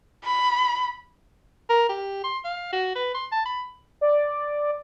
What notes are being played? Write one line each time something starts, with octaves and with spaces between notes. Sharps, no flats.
B5
A#4
G4
C6
F5
F#4
B4
C6
A5
B5
D5